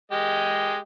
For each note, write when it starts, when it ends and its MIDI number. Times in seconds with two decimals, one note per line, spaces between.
0.12 0.76 56
0.12 0.76 67
0.12 0.76 75